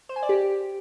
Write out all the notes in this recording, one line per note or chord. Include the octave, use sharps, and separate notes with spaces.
C5
G#5
D5
G4